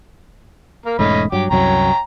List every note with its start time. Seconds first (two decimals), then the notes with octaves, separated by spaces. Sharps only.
0.86 A#3 A#4
0.99 E1 G#2 A3 C#4 D#5 B5
1.32 G2 F#3 G5 D6
1.51 C2 F#2 F#3 C#5 G5 A#5